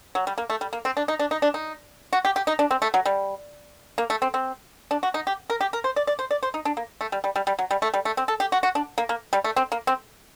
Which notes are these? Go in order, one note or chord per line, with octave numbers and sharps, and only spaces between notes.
F#3
G3
A#3
A3
G3
A#3
C4
D4
D#4
D4
D#4
D4
D#4
F#4
G4
G4
D#4
D4
C4
A3
F#3
G3
A#3
A3
C4
C4
D4
F#4
D#4
G4
A#4
G4
A#4
C5
D5
D5
C5
D5
C5
D#4
D4
A#3
A3
G3
G3
G3
G3
F#3
G3
A3
G3
A3
C4
A4
G4
F#4
F#4
D4
A#3
A#3
G3
A3
C4
A#3
C4